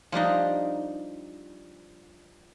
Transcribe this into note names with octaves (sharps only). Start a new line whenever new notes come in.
F3 G3 D4 D#4